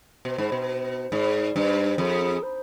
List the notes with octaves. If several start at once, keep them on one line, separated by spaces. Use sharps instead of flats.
B2 C5
G#2
B2
G#2 D5
G2 C5
F2 G#4
C5